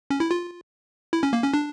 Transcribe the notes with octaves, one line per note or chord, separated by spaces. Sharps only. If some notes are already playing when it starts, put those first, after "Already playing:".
C#4
E4
F4
E4
C#4
A#3
C#4
D4